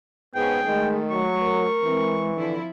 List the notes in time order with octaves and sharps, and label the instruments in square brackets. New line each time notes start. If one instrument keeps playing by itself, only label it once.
[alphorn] G#2 [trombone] B3 [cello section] C#4 G#4 [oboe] G5
[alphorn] D#3 [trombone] G#3 [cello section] A3
[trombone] F#3 [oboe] C#6
[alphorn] A#4
[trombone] E3 [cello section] G#3 C4
[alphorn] D3 [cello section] F3 E4